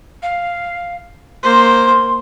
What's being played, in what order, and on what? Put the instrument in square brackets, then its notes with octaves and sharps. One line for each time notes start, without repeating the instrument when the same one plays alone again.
[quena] F5
[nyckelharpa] A#3 C5 [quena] C6